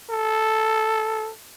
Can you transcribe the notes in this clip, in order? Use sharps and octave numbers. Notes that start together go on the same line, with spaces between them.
A4